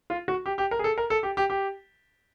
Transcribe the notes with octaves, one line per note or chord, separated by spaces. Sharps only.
F4
F#4
G4
G4
A#4
G#4
A4
A#4
A4
G4
G4
G4